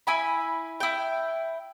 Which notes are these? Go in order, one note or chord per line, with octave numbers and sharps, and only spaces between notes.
E4 G#5 B5
E4 G5